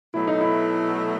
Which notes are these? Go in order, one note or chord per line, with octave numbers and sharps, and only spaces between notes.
B2 F#3 A3 E4
D#4
E4